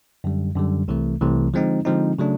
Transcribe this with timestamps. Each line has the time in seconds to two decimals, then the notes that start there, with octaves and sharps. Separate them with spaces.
0.24 F#2 D3 G3
0.56 F#2 D3 G3
0.88 C2 C3 E3 A3
1.21 C2 C3 E3 A3
1.53 D3 F3 G#3 C4 D#4
1.85 D3 F3 G#3 C4 D#4
2.19 C#3 F#3 A3 D4